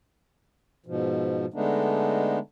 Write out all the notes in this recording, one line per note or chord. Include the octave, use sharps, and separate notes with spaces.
G#2 B2 F3
D3 G#3 A3 B3 D4 D#4